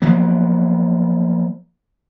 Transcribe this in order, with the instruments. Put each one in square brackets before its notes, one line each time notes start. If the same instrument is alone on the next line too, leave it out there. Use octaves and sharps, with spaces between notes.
[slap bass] F3 F#3 A#3 B3